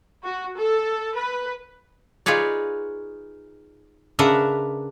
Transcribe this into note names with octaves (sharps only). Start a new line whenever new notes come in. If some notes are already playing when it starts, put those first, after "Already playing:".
F#4
A4
B4
D#4 F4 G#4 B4 C#5 D5
C#3 D4 A#4 B4 E5 F#5